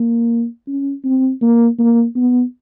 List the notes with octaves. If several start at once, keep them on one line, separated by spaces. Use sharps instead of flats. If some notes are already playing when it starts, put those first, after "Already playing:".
Already playing: A#3
C#4
C4
A#3
A#3
B3